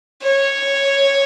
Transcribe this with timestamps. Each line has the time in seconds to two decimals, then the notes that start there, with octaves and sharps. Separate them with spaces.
0.22 C#5